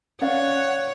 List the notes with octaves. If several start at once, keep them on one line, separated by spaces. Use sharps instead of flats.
C#4 C#5 D5 F5 F#5